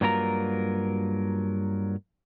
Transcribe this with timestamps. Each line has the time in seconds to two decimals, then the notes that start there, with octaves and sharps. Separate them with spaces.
0.01 G2 F#3 A#3 F4 A#4 A#5